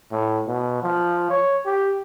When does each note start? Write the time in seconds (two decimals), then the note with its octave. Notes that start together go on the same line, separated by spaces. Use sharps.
0.12 A2
0.48 B2
0.82 F3
1.30 C#5
1.66 G4